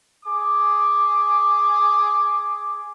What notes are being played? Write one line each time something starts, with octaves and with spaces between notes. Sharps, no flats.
G#4 D6